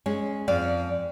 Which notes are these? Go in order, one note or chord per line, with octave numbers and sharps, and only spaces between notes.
G#3 C#4
F2 D5 F5